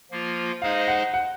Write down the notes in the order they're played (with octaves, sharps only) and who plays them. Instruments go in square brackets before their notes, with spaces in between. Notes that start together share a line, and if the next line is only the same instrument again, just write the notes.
[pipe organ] F3 A#3 F4
[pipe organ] G#3 D#4 G#4 C5 D#5 [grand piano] F5
[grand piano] F#5
F#5